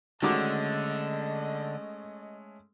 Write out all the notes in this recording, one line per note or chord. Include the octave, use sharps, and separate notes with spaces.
D3 D#3 G#3 A3 C#4 F#4 D#5 D6